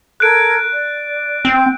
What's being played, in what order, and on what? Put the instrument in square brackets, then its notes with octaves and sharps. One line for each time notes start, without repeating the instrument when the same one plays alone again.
[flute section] A4 A#4 G#6 [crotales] F#6 D7
[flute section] D5
[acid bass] C4 [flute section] G5